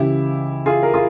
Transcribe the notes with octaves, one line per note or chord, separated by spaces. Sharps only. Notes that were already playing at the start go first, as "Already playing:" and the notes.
Already playing: C#2 C#3 E3 E4 G4
F4 G#4
A#4
F4 G#4